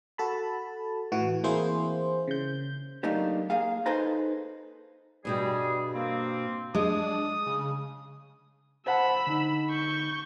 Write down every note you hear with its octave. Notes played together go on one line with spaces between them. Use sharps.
F#4 A4 A5 B5
A2 E3 F#4
E3 A#3 C4 E4 G#4 C5
C#3 G6
F#3 A3 A#3 D4 D#4 G4
A#3 G#4 F5
D#4 G#4 A4 B4 C5 A#5
G2 B2 G3 G#4 G5
A#3 C4
G#3 D4 D#6
C#3
C5 F#5 A5 B5 E6
D3 D#4
C#6 G6